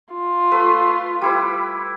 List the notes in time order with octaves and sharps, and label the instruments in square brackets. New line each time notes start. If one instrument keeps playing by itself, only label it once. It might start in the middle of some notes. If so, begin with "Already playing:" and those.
[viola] F4
[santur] A3 B4
G3 E4 B4